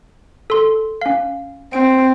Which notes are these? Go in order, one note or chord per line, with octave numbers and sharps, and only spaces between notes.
A4 C6
C#4 F5
C4 D7